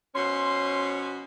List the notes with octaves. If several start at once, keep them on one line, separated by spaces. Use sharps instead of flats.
B2 F3 C#4 C6